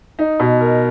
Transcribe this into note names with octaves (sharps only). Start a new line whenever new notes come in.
D#4
B2
A#4